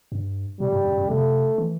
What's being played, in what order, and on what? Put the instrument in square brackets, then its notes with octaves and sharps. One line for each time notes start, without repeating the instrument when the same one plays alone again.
[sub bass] G2
[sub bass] B2 [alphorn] G3
[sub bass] G2
F#2
F#2
[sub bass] C3 [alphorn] A3
[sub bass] E3